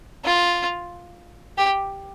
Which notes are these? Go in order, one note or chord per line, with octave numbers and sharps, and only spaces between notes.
F4
G4